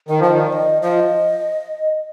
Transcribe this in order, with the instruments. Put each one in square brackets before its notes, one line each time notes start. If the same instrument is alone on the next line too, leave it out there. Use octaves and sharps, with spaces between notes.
[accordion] D#3 [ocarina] D#5
[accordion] F3 [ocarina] D#5
[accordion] D#3
[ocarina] D5
D#5
[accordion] F3 [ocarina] D#5